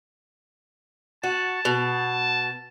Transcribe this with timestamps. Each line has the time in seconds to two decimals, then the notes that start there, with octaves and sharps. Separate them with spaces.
1.24 F#4 A5
1.65 B2